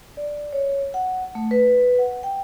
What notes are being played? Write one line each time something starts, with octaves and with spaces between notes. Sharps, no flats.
D5
C#5
F#5
A3
B4
F#5
G5